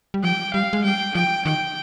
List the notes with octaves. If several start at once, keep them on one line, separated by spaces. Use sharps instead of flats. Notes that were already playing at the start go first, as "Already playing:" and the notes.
G3
F3 G5
G3 F5
G#3
G3 G5
F3 G5
D#3 G5